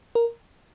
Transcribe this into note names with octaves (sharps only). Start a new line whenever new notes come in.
A#4